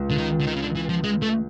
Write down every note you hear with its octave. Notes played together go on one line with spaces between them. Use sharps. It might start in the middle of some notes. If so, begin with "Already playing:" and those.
Already playing: C#2
D3
D#3
D3
D#3
C#3
D3
E3
F3
G#3
A3